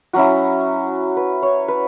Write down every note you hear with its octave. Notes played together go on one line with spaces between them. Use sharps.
F#3 C#4 E4 F#4
B4
C#5
B4